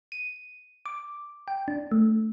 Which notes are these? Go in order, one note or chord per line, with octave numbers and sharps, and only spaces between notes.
D#7
D6
G5
D4
A3